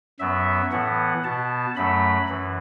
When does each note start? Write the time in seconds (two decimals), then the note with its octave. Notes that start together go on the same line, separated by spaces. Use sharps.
0.20 F#2 F#3 B3 E5
0.72 A2 E3 B3 F#5
1.24 B2 B3 A5
1.76 F#2 F#3 A3 B5
2.29 F#2 E3